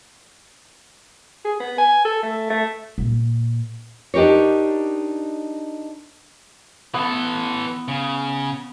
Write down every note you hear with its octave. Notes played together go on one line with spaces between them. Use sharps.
G#4
B3
G#5
A4
A3
A3
A#2
D4 D#4 G4 A#4 C#5
E3 B3 A4
C#3